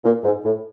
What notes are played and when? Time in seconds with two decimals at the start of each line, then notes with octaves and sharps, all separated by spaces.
0.04 A#2
0.24 G#2
0.45 A2